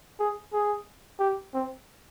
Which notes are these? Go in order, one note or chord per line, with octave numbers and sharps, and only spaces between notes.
G#4
G#4
G4
C4